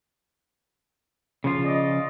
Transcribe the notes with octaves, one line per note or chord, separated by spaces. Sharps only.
C#3 F3 F4
D5 D#5